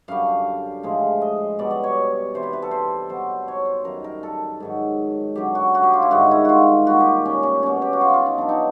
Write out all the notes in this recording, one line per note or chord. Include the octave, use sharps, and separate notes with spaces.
F#2 D3 G3 F5
A2 F3 G#3
D#5
B2 G3 D5
D5
C#5
C3 E3 G3 C5
B4
B4
A4
C5
B2 F#3 C5
C#5
C5
F#2 D#3 G3 A#4
A#4
A4
G#2 D#3 F#3
F#2 D3 F#3 G4
F#4
F#4
G4
F4
E4
G#2 D#3 G3 F#4
E4
F4 F#4
A#2 G3 F#4
G4
C#4
C#4
B2 F#3 C#4
G4
F#4
F4
F4
D#4
B2 F#3 D4
D#4